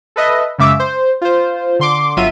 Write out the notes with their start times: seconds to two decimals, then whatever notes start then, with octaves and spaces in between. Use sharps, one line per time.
0.16 A4 B4 D#5 E5
0.58 F#2 C#3 G#3 E5 D6 E6
0.80 C5
1.21 F4 C5
1.79 D3 C6 D6
2.17 G1 F#3 F4 E5 D#7